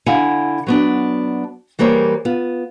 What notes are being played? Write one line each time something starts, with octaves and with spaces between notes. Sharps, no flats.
D3 E4 F5 F#5 G#5
F#3 B3 D4
E3 G3 A#3 G#4 C5 C#5
B3 F4